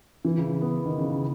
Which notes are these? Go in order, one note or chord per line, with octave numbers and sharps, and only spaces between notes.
E3
C#3
C#3
B3
D#3
C#3
C#3